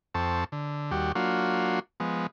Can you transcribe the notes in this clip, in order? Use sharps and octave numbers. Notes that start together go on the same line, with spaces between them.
F2 C4 A4 A5 C#6
D3
D#2 G3 F#4 G4
F#3 A#3 D4 F4 F#4
F3 G#3 B3